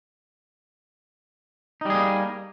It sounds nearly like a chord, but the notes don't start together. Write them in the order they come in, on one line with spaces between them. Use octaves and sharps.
D#4 G3 G#4 A#3